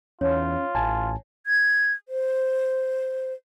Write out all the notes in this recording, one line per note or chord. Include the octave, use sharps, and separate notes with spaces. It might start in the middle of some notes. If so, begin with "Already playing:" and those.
E2 C#4 D#4 F4 C#5
A1 G#5 A5
G#6
C5